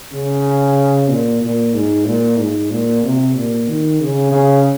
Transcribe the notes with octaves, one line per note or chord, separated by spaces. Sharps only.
C#3
A#2
A#2
G#2
A#2
G#2
A#2
C3
A#2
D#3
C#3
C#3